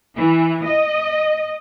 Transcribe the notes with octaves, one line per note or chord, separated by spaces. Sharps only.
E3
D#5